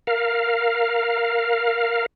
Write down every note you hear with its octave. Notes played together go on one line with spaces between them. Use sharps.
A#4 F5